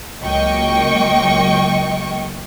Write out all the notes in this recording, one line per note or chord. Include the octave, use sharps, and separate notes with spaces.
C#2 F#3 A#3 D#5 G5 C#6